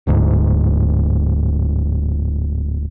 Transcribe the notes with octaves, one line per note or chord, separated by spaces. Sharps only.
D1 D2 G#2